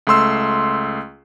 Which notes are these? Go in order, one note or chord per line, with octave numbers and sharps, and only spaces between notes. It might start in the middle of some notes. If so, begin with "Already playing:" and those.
C#2 A3 C6 E6